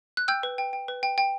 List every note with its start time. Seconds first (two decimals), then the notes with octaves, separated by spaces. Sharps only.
0.17 F#6
0.28 G5 E6 G6
0.43 B4
0.58 G5
0.73 G5
0.88 B4
1.03 G5
1.18 G5